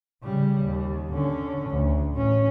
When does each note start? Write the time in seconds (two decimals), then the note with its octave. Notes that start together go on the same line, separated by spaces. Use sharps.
0.23 C#3 G3
0.65 D#2
1.13 D3 C#4
1.69 D2
2.15 A1 C#4